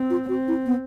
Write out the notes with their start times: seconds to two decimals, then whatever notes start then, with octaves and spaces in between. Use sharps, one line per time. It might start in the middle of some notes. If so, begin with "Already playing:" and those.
Already playing: C4
0.10 F4
0.29 C4 F#4
0.48 E4
0.66 B3